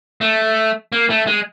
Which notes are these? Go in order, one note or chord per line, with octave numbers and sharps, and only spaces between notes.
A3
A#3
A3
G#3